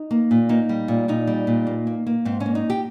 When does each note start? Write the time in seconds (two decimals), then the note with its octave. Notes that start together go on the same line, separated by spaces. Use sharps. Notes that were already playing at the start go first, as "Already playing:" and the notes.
Already playing: D#4
0.11 A#3
0.31 A#2
0.49 A#3 D#4
0.69 G3
0.88 A#2
1.08 A#2 D#4
1.27 G3
1.47 A#2
1.67 A#3
1.87 A#3
2.07 A#3
2.25 G#2 C4
2.40 C#4
2.46 A#3
2.55 D#4
2.70 G4